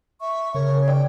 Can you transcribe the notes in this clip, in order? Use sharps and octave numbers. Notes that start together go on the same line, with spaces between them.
E5 C#6
C#3 A#4 C#5
D5 G5